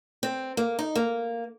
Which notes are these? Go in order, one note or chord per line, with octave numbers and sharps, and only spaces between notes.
C4
A#3
D#4
A#3